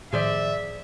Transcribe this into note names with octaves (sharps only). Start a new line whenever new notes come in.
A2 D#3 F3 G#4 C5 D5 E5